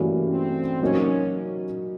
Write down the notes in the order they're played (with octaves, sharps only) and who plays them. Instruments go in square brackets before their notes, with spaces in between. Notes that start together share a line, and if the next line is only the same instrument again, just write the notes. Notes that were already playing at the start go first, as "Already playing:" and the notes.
Already playing: [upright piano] G2 E3 A3 C#4 F#4 [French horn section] A#3
[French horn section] C4
[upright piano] F#3 A#3 D#4 F#4 [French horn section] C#4